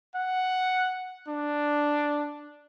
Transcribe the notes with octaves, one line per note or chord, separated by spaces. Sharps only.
F#5
D4